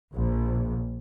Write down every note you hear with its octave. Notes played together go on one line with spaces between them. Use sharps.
A#1